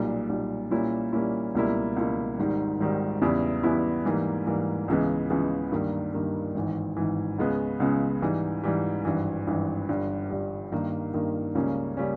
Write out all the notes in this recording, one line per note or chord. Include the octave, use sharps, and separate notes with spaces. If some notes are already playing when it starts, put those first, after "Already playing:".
Already playing: B1 A#2 G3
B1 A#2 G3
A#2 G3 A#3 C#4 E4
A#2 G3 A#3 C#4 E4
C#2 B2 G3 A#3 E4
C#2 B2 G3 A#3 E4
G#1 G#2 D#3 G3
G#1 G#2 D#3 G3
E2 C#3 G3 B3 E4
E2 C#3 G3 B3 E4
G#2 E3 G3 A#3
G#2 E3 G3 A#3
C#2 C#3 E3 G#3 B3
C#2 C#3 E3 G#3 B3
G2 D#3 G3 A#3
G2 D#3 G3 A#3
G#1 G#2 E3
G#1 G#2 E3
C#2 C#3 G#3 B3
C#2 C#3 G#3 B3
G#2 E3 G3
G#2 E3 G3
G#1 G2 E3
G#1 G2 E3
G1 G2 G3
G1 G2 G3
G2 D#3 A#3
G2 D#3 A#3
C#2 C#3 G3 A#3 C#4
C#3 G3 A#3 C#4